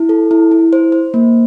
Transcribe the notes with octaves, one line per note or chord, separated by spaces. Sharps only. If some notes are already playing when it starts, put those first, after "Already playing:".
Already playing: E4
A4
E4
E4
C5
C5
A#3